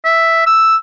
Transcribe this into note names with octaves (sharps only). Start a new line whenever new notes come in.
E5
E6